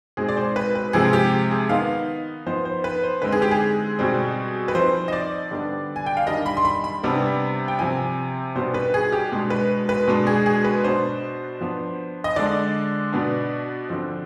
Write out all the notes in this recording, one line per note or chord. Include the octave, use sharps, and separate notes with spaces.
B2 G#3 C4 D#4 G#4
D5
C5
B4
B4
C3 F3 G#3 C4 G#4
G4
G#4
D#3 B3 D#4 F5
F3 B3 D#4 C5
C5
B4
C5
D3 G#3 C4 D#4 B4
G#4
G4
G#4
B2 G3 C4
B4
F3 C4 D#4 C5
D#5
D5
D3 G3 B3 D4
G#5
G5
F5
D#3 G3 D4 D#5
B5
C6
B5
B5
C3 G3 B3 D4
G5
C3 F3 C4 G#5
B2 G3 B3 D4 C5
B4
G#4
G4
B2 G#3 D4
B4
B4
B2 G#3 D4
G#4
G#4
B4
B2 B3 D4 C5
F3 B3 D4
D#5
D3 G#3 D4 D5
B2 B3 D4
D3 F3 C4